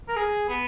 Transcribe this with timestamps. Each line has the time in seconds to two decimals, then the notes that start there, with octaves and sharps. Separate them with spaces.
0.08 A#4
0.16 G#4
0.49 B3